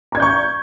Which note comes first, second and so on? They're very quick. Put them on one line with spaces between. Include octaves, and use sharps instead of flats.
A#5 G#6 D5 G6 C#6